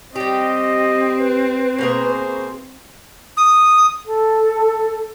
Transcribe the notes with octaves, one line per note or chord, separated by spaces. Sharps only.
G3 C4 G4 D#5
B4
B2 A#3 G#4 C5
D#6
A4